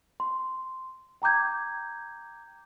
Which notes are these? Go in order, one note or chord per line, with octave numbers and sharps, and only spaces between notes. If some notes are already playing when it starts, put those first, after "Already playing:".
C6
G5 A#5 D6 G6 G#6